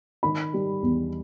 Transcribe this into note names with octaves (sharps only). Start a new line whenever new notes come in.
D#3 B5
G3
E2